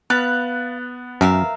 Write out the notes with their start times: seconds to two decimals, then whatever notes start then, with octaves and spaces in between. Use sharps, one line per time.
0.10 B3 F5 B5 F#6 A6
1.21 F#2 A#4 E5 F5